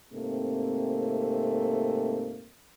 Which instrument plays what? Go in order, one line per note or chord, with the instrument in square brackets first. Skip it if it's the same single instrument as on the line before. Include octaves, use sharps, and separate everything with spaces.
[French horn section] G#2 C3 A3 A#3 C4